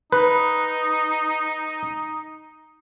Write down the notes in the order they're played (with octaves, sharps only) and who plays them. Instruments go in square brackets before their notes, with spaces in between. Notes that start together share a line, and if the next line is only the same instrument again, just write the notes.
[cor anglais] D#4 [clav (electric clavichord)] B4